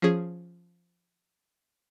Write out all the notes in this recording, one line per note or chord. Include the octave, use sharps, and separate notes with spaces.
F3 C#4 G#4